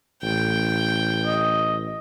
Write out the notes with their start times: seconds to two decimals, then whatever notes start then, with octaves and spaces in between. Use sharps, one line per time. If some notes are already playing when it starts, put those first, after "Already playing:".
0.23 A1 G5
1.26 D#5